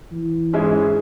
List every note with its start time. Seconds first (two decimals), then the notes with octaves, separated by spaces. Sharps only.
0.12 E3
0.53 G#2 G#3 C#4 E4 G#4